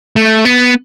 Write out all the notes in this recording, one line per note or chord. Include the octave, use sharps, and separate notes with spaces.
A3
B3